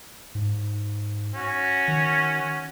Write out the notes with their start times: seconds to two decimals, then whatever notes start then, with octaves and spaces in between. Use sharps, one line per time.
0.35 G#2
1.34 C#4 F#4
1.88 D#3